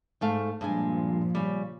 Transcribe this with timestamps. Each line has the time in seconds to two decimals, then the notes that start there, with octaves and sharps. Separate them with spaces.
0.21 G#2 A3 F5
0.61 G2 A#2 F3 G#3 G#5
1.35 C#3 G3